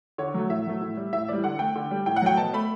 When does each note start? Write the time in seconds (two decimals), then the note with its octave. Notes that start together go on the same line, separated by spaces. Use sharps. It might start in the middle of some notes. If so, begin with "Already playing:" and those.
0.18 D3 C#5
0.34 F#3 A3
0.50 A2 E5
0.66 F#3 A3
0.81 A2
0.97 G3
1.13 A2 E5
1.28 E3 G3 D5
1.44 D3 F#5
1.59 A3 G5
1.76 D3
1.91 G3
2.06 A2 G5
2.16 F#5
2.22 F#3 A3 G5
2.37 B2 A5
2.54 A3 B5